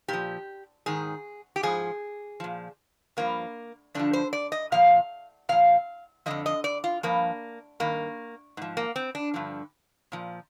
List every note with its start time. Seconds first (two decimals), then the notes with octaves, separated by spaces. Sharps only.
0.08 A#2 F3 G4
0.86 G#2 D#3 G#4
1.56 G4
1.63 G#2 F3 G#4
2.40 A#2 F3
3.17 G2 F3 A#3
3.95 G2 D3 F3 D4
4.13 C5
4.33 D5
4.52 D#5
4.72 A#2 F3 F5
5.49 A#2 F3 F5
6.26 F2 D3 F3 D#5
6.46 D#5
6.64 D5
6.84 F4
7.03 G2 F3 A#3
7.80 G2 D#3 A#3
8.57 G#2 F3
8.77 A#3
8.96 C4
9.15 D4
9.34 G2 D3 F3
10.12 A#2 F3